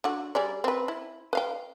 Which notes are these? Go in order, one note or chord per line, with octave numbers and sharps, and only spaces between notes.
D3 F#4
G3 G#4 D5
C4 B4
E4
B4 F5 G5